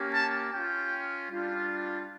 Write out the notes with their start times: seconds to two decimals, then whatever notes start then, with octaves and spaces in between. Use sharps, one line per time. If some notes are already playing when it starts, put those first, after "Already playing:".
Already playing: A#3 C#4 G4
0.14 A5
0.52 C#4 F4 G5
1.31 G3 D4 F4